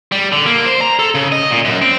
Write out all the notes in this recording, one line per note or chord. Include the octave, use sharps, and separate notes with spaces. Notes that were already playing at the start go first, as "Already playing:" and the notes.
G3
D3
A#3
C5
A#5
A4
C#3
D#5
A#2
F#2
C4